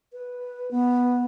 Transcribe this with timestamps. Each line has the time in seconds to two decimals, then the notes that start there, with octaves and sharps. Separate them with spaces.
0.13 B4
0.71 B3